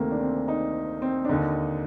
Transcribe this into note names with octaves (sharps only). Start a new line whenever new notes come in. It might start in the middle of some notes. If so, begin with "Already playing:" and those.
Already playing: D2 C3 D#3 A3 A#3
D4
C4
D#4
C4
D4
D#2 D3 D#4